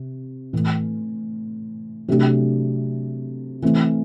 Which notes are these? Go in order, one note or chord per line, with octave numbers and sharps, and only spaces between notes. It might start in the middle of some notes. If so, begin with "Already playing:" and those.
Already playing: C3
A2 E3 A3
C3 F#3 A3 D4 G4
E3 A3 C4